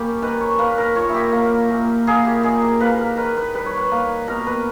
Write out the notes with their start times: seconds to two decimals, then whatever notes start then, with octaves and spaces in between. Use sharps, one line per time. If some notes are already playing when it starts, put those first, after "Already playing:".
Already playing: G3 A#3 C#4 G4
0.22 D#3 B4
0.40 C#5
0.59 A#3 B4
0.78 A#4
0.95 A#2 C#5
1.09 E4 G4
1.32 A#3
1.70 A#2
2.07 A#3 G#4
2.25 G4
2.43 D#3 G#4
2.62 G4
2.80 A#3 B4
2.99 A#4
3.17 D#3 B4
3.37 B4
3.54 G3 B4
3.66 C#5
3.77 B4
3.92 A#3
4.28 B2 A#4
4.47 B4